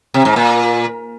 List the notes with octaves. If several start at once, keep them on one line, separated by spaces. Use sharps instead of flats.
C3
G#2
A#2